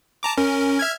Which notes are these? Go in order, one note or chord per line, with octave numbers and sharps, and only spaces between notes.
A5 A#5 D6
C#4 A#4
E5 F6 G#6